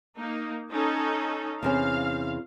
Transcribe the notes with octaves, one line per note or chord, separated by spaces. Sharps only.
A#3 D#4
C#4 D#4 A4
E2 C3 C#4 F5